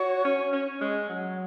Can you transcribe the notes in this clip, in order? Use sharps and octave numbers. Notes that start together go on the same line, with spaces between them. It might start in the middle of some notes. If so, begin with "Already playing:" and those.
Already playing: F#4 C#5
C#4
C#4
G#3
F#3